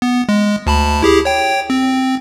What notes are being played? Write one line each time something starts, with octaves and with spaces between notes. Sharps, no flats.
B3
G#3
D2 A5 B5
E4 G4 G#4
C#5 G5
C4